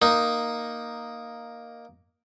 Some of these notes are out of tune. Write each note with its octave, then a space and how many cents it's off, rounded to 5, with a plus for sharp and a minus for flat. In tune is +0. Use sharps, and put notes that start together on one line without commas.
A#3 +5 D#4 +0